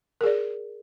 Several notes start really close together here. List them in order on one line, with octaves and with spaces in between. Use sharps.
A#4 G#4 D5